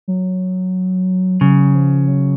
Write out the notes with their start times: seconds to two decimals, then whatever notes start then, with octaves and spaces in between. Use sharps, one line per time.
0.08 F#3
1.41 C#3 F#3
1.75 F3
2.08 F#3